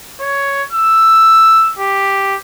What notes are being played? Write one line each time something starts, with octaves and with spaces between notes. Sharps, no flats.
C#5
E6
G4